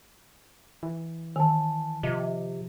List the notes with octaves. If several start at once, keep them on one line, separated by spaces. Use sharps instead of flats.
E3
D#3 G#5 A5
C3 F3 D#5